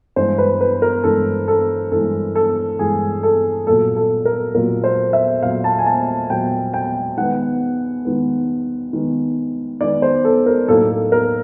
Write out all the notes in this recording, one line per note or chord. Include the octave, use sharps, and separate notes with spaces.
G2 E3 G#3 C5
B4
B4
A#4
G2 E3 G#3 A4
A4
G2 E3 G#3 A4
A4
G2 E3 G#3 G#4
A4
A#2 F#3 A#3 A4
A4
A#4
A#2 F#3 A#3 A#4
C5
E5
A#2 F#3 A#3 F5
A5
G#5
A5
A#2 F#3 A#3 G5
G5
D#3 G#3 B3 F#5
D#3 G#3 B3
D#3 G#3 B3
D#3 G#3 B3 D5
C5
A4
A#4
A2 F#3 A#3 D#4 A4
A4
A#4